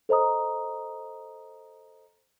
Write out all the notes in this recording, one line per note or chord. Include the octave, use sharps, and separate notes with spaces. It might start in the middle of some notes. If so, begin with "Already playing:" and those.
A4 C5 D#5 A#5 D#6